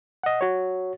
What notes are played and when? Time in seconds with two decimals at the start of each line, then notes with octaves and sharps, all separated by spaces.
0.23 D#5 F#5
0.41 F#4 C#5